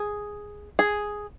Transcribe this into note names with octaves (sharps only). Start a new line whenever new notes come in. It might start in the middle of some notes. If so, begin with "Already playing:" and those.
Already playing: G#4
G#4